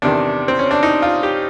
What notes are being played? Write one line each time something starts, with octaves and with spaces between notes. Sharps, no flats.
E2 C3 D#3 D4
C4
C#4
D4
D#4
F4
G4